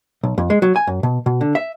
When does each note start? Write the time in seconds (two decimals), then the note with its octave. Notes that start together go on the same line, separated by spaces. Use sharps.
0.23 B1
0.38 F2
0.50 G#3
0.62 F#3
0.76 G#5
0.87 F#2
1.03 B2
1.26 B2
1.41 D3
1.55 E5